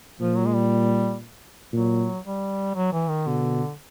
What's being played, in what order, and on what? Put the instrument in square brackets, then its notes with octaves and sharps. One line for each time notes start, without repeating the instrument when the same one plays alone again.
[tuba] A#2 [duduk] F3
[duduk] F#3
G#3
G3
[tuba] A#2 [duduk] F#3
[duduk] G3
F#3
E3
D#3
[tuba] B2 [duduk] D3